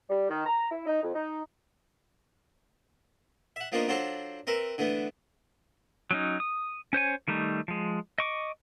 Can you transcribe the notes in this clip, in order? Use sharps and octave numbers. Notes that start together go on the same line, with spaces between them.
G3
D#3
A#5
E4
D#4
F2
D#4
E5 F#5
F3 A#3 B3 D4 D#4 F4
F#3 D4 F4 F#4 A4 C5
C4 A#4 B4 E5
D3 E3 A3 B3
F#3 C#4 D#4
D#6
C#4 C5 C#5 G#5
D#3 G3 A3 D#4
F3 G#3
D#5 C#6 D6